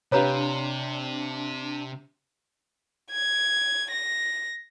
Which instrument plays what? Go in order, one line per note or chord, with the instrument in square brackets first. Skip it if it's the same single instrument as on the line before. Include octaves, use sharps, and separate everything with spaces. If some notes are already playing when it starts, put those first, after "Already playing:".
[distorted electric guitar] C3 [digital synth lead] D4 [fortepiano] F4 G4 B4 [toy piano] C#5 A#5
[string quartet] G#6
A#6